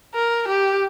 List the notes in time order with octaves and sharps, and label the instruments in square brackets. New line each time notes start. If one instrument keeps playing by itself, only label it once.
[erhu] A#4
G4